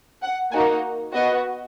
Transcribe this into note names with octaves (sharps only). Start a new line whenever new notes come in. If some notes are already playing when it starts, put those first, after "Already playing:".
F#5
A#3 D#4 F#4 G#5
B3 F#4 D#5